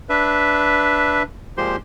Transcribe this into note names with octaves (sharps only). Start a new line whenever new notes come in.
D4 B4 E5
A#2 F3 G#3 G4 C5 C6